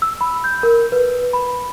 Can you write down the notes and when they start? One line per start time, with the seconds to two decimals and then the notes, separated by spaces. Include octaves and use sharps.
0.02 E6
0.21 B5
0.44 G6
0.63 A#4
0.92 B4
1.33 B5